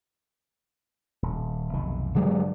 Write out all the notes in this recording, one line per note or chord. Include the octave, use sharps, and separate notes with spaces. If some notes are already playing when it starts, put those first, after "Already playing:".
D#1
F1 B1 D#3
G2 D3 F#3 G#3